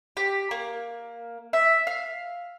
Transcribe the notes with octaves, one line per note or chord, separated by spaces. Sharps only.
G4
A#3
E5
F5